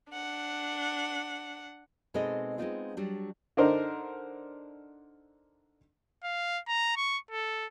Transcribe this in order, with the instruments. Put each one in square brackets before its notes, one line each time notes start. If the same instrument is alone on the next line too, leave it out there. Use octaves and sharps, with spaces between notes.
[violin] D4 F#5
[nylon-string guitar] B2 G#3 C4 D#4 A4 D#5
G#3 B3 C4 D4 D#4 F4
F#3 G3 D4
[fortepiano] D3 D4 D#4 A#4 C5
[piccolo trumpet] F5
A#5
C#6
A4